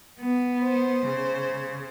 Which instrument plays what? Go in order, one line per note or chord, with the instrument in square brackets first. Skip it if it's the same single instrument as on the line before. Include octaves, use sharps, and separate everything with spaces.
[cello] B3
[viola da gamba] C5
[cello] C#3